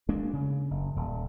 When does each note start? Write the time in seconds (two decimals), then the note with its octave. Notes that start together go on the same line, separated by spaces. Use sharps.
0.09 D2 G#3 A#3 D4
0.33 C#3
0.71 F#1
0.96 D#1